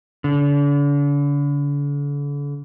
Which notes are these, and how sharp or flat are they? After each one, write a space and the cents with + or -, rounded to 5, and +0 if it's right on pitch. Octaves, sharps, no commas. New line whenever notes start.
D3 -40